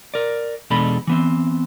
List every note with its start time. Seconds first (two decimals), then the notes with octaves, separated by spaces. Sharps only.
0.14 A#4 D5
0.70 E2 B2 G#3 D4 A4 B5
1.07 E3 B3 C4